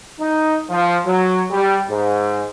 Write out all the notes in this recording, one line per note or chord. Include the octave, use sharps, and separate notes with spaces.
D#4
F3
F#3
G3
G#2